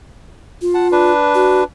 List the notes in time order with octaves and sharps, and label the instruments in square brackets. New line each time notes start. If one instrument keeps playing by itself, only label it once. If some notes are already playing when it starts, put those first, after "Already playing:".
[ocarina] F4
[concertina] F#5 A5
D4 B4
[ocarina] F#4